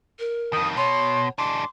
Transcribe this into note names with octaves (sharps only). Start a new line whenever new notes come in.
A#4
F2 D#3 D#6
B2 C#5 C6
G#3 D4 C6 D6